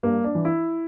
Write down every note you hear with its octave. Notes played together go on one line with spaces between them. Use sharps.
G2 A#3
D4
E3
E4